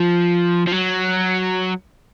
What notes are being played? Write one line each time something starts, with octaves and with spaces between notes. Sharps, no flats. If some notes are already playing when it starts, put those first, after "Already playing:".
Already playing: F3
F3
F#3